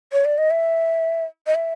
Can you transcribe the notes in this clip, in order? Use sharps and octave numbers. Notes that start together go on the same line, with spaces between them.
C#5
D5
D#5
E5
D#5
E5